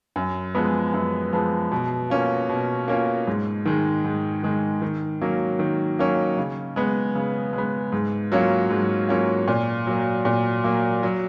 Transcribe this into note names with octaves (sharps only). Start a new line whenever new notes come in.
F#2
F3 G#3 B3
F#2
F3 G#3 B3
B2
A#3 C#4 F4
B2
A#3 C#4 F4
G#2
D#3 G#3
G#2
D#3 G#3
D#3
F#3 A#3 C#4
D#3
F#3 A#3 C#4
C#3
G#3 B3
C#3
G#3 B3
G#2
F#3 A#3 C#4 F4
G#2
F#3 A#3 C#4 F4
A#2
F#3 A#3
A#2
F#3 A#3
F#3